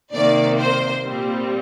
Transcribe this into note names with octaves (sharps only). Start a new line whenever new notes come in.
C3 D#3 A#3 D5
C5
A#2 G3 C4